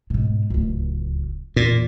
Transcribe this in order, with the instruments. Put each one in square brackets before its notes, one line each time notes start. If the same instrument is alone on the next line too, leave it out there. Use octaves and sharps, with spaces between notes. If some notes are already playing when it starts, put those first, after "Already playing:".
[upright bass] G#2 B2
D1 C#2
[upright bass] E2 [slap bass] A#2